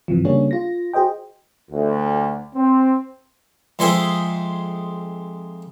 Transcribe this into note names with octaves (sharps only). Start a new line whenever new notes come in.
G2 C3 E3 F3
C#3 G3 A#3 D4 G#4 C#5
F4 A#6
F#4 G#4 C5 D#5 G5
D2
C4
F2 G#3 G#4 C5 E5 C6